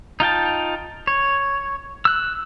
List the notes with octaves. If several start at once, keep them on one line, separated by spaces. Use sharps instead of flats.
D#4 F4 G5 A5
C#5
E6 F#6